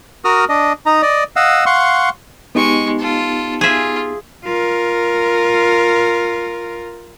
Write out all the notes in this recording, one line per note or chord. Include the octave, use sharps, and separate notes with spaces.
F#4 A#4 D#6 F6
D4 D#5
D#4 A#5
D5 D#5
D#5 F5 F#5 E6
F5 F#5 C6 C#6
G#3 B3 D#4 G4 C#6
F4 A4
F4 G#4 E5
F4 A#4